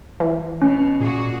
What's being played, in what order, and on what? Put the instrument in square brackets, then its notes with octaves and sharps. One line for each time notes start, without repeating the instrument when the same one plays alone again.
[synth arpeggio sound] E3
[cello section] B2 [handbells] C#4
[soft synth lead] A#2 [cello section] A#3 F#4 G#4